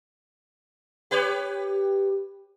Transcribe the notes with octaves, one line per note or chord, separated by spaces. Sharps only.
G4 B4 C#5